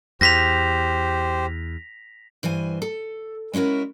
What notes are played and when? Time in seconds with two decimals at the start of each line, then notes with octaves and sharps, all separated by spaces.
0.21 E2 G4 C5 A#6 B6 F7
2.43 G2 E3 C5 G#5
2.82 A4
3.53 G#3 C#4 E4 F#4 A#4